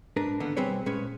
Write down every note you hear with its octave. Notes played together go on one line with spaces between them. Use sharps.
G#2 D4 A#4 B4
D3 D#3 A#3 B3
B1 G3 C4 G#4 B4 C#5
A#2 G#3 C#4 B4 C#5